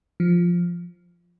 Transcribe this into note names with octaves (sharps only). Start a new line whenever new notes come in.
F3